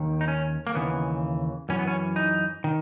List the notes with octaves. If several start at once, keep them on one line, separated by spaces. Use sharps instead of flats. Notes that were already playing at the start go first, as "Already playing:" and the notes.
Already playing: D#2 D#3
D#4
C#4
A#3
D#2 C#3 E3 B3
F#2 E3 C#4
B3
C#4
D#4
D#3